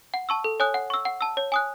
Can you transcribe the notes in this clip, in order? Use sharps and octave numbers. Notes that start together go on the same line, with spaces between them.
F#5
A5 C#6 E6
A4
C#5 G#5 D#6 F#6
F#5
C#6 E6
F#5
A5 E6
C#5
G#5 D#6 F#6